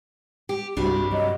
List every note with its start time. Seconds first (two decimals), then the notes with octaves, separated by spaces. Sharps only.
0.49 G4
0.77 C2 G2 C3 G3 D4 F#4
1.12 F#3 D#5